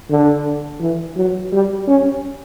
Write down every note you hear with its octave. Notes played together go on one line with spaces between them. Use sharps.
D3
E3
F#3
G3
C#4